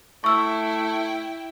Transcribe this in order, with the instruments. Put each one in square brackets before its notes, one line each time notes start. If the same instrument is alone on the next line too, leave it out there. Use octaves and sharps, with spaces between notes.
[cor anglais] A3 [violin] E4 G5 [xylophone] C#6 E6